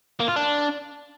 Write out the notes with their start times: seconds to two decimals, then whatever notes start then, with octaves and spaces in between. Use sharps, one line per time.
0.20 A#3
0.28 F4
0.36 D4